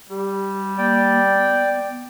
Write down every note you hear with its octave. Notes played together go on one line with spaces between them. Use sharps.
G3 G4
A#3 D5 G5
B3